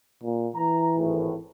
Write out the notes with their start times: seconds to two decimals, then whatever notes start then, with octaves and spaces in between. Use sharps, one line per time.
0.23 A#2
0.56 E3 A#5
0.97 G#1 A2